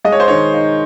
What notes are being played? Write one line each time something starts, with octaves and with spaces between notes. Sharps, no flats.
G#3 D#5
C#5
C5
D#3 C#5
D#4